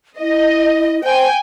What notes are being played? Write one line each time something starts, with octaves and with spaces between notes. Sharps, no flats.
E4 D#5
C5 G5 G#5